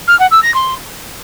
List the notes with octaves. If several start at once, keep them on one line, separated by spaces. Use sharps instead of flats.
F6
F#5
E6
A#6
C6